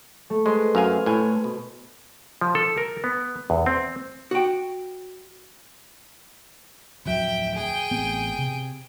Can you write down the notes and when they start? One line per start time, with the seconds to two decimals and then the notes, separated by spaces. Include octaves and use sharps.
0.30 A3
0.46 G#3 B4 C5 C6
0.75 F#2 F5 G#5
1.06 A2 G#5 F6
1.44 B2
2.41 F3
2.55 A4
2.78 A#4
3.04 B3
3.50 E2
3.66 C4
4.31 F#4 G5
7.06 D1 F2 F#3 E5 G5
7.54 G#4 G5
7.91 A1 B3 C4
8.38 C3